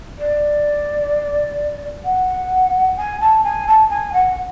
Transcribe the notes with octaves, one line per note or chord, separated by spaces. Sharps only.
D5
F#5
G#5
A5
G#5
A5
G#5
F#5